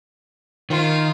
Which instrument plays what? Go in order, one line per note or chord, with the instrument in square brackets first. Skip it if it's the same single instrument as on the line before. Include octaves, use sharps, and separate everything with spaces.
[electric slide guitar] D#3 [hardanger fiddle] F4